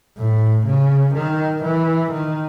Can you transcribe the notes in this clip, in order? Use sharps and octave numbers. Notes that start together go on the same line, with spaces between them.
A2
C#3
D#3
E3
D#3